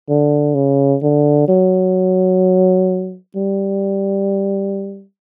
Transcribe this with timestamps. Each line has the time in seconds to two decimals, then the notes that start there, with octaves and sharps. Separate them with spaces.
0.09 D3
0.55 C#3
1.03 D3
1.48 F#3
3.36 G3